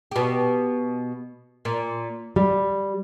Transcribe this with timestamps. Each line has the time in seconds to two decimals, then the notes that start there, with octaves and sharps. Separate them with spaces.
0.11 B2 G4
1.65 A#2
2.36 G3